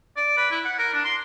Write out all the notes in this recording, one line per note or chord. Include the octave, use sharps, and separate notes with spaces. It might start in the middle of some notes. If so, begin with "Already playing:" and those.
D5
B4
E4
F#5
A#4
D4
C6